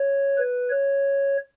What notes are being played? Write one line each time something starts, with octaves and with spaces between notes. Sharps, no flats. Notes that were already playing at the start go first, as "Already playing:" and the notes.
Already playing: C#5
B4
C#5